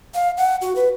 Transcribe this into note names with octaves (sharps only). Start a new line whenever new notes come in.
F5
F#5
F#4
B4